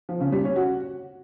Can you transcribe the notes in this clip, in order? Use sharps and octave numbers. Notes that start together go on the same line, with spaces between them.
F3
C#3
G3
C#4
F#4